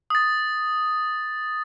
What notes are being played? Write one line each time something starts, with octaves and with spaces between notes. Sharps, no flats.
D#6 A6